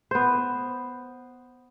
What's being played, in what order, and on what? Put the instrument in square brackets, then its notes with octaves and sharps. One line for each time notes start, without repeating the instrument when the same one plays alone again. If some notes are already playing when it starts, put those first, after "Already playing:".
[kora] B3 C5